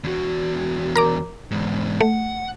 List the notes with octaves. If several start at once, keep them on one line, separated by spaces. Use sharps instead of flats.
E2 F#4
A#4 A#5 D6
E2 G#2
A3 F#5